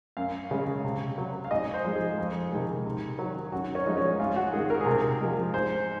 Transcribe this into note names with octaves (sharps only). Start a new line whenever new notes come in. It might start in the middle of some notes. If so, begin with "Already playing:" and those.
F#2 F5
C#3 G#3
C3
F#3
F5
G#2 D#5
C5
F3 G#3
G#4
F2
C3 D#3 G#3
C3
D#3 F#3
F#2 F#4
C#4
F3 G#3 D#4
C#4
G#2 F4
F#4
D#3 G#3 G#4
A#4
G#4
C3
A#4
F3 G#3
G#2 C5